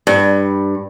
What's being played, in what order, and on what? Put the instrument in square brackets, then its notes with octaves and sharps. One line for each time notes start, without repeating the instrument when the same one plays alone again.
[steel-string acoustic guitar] G2